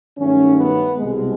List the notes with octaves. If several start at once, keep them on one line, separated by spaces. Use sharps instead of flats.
G2 D#3 F#3 A3 C#4
B3
C2 B2 G#3